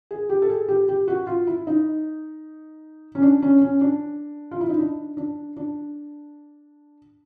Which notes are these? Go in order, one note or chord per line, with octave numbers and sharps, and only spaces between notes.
G#4
G4
A4
G#4
G4
G4
F#4
F4
E4
D#4
C#4
D4
C#4
C#4
D4
F4
E4
D#4
D4
D4
D4